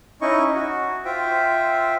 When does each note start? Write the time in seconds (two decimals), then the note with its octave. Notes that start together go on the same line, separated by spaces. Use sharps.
0.21 C#4 D#4 E4 D#5 C#6
0.55 F#4
1.05 F4 C5 E5 G5